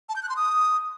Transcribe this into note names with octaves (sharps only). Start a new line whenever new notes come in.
A5
G6
F#6
C6
D#6